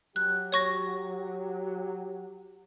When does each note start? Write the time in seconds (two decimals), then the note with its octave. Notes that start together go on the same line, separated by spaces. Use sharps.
0.16 F#3 G4 F#6
0.52 C#5 C#6 A#6